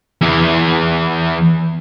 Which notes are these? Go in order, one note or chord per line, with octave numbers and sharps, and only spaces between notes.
E2 E3